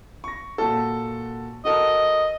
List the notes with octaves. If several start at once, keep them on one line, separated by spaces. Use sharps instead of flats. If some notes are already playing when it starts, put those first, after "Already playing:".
C#6 A#6
A#2 F#4 A4
F#4 A4 A#4 D#5